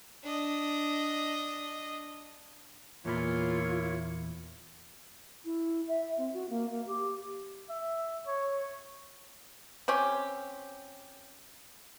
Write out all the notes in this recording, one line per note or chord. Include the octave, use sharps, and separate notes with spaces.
D4 D#5
E2 A#2 A#3 E4 F4 C#5 B5
E4
E5
C4
F#4
A#3
A#3
G4
E5
C#5
C4 C#4 G4